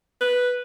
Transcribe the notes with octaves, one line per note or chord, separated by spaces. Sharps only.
B4